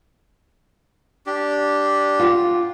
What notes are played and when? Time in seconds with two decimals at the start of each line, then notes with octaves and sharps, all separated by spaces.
1.27 D4 G4
2.19 F4